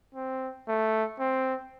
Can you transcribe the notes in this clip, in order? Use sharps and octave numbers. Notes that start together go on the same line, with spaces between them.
C4
A3
C4